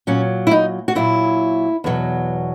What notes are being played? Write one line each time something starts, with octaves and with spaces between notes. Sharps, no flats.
A#2 F#3 C#4
E4
D#4
F#4
A#2 F#3 E4
E2 B2 F#3